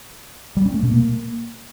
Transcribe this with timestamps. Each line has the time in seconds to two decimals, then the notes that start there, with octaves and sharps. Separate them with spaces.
0.57 G3
0.65 C#4
0.74 A3
0.83 B2
0.91 A#3